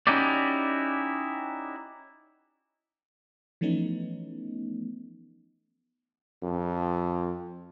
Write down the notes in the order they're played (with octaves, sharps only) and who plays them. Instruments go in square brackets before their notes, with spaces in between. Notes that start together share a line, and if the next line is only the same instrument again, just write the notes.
[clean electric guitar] C#4 D#4 E4 F#4 G4 D5
[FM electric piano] E3 F3 A3 B3 C#4 D#4
[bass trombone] F2